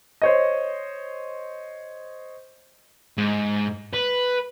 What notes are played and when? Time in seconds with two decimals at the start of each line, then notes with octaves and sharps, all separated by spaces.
0.22 C5 C#5 D#5
3.18 G#2
3.94 B4